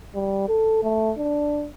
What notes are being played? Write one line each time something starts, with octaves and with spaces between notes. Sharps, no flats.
G3
A4
A3
D4